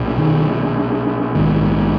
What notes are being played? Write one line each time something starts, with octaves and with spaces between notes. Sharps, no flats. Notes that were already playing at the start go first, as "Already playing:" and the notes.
Already playing: B1 A#2
D#3
A#1 G#2 D#3